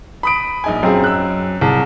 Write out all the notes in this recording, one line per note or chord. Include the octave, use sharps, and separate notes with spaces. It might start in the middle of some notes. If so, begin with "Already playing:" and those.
B5 D#6 D7
A#1 D#4 G#5
F#2 C4 F4 G#4
E6 F#6
C2 G#4 A5